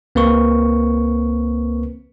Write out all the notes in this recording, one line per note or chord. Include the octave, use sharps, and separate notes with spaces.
C#2 A#3 C4 A#4 B4 C#6